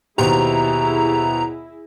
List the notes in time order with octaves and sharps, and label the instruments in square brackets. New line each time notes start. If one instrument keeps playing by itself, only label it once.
[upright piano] D#2 B2 C5 [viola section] E4 G#4 [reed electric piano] G4 [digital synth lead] A#5